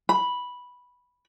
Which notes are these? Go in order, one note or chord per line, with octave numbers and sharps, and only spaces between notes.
B5